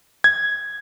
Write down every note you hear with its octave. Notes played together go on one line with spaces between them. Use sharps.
G#6